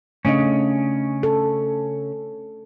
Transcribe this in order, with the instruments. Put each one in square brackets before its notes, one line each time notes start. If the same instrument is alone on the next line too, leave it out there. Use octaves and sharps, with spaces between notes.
[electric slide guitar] C#3 C#4 [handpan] A3 D4 D#5
[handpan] A4